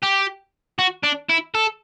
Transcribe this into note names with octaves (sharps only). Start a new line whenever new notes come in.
G4
F#4
D4
E4
A4